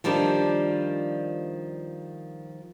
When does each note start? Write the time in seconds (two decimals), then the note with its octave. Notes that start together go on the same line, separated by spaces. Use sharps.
0.04 D#3 F3 G3 D4 G4